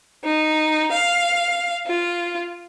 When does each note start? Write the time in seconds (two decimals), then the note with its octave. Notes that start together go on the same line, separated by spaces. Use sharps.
0.24 D#4
0.92 F5
1.86 F4